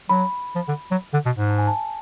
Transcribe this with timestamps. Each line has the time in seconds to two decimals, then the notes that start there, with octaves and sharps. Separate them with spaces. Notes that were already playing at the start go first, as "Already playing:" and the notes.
0.09 F#3 B5
0.55 F3
0.68 D3
0.91 F#3
1.13 D3
1.26 B2
1.38 G#2
1.49 A5
1.58 G#5
1.67 A5